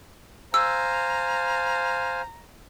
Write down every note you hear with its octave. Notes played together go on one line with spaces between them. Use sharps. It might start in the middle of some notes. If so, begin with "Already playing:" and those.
C5 F5 G#5 A#5 E6